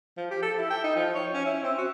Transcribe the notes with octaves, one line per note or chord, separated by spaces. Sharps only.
F3
G4
A4
E4
G5
D#4
F3
C#5
C#4
E4
C4
F#4